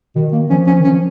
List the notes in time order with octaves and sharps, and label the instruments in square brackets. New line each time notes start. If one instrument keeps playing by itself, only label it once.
[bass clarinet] B2 [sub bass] D#3
[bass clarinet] A#3
[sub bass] F3 [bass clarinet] C#4
[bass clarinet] C#4
[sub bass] D#3
[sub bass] F3 [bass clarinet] C#4